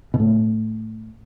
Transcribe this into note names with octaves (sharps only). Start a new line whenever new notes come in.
B2
A2